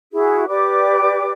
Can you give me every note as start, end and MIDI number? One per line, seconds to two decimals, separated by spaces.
0.12 0.47 64
0.12 0.47 66
0.12 0.47 68
0.47 1.32 67
0.47 1.32 71
0.47 1.32 74
0.47 1.32 86